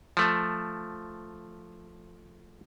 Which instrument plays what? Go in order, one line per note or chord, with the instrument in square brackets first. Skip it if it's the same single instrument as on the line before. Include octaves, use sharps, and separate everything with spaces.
[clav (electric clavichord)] F3 A3